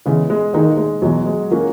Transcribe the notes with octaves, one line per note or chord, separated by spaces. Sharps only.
C#3 E3 G#3 B3
G#3
D#3 G#3 A#3 D#4 G#4
G#3
E2 B2 F#3 G#3
G#3
F#3 A#3 C#4 F#4